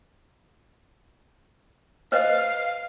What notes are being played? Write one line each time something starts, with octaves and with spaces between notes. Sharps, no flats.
B4 C5 D#5 F5